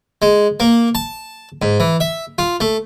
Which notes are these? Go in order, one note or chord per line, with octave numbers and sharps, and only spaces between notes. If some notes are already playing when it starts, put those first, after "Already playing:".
G#3
A#3
A5
G#2
E3
E5
F4
A3